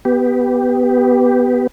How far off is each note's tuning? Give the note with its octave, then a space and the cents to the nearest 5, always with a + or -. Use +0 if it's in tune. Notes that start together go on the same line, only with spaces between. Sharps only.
B3 +0 G4 +0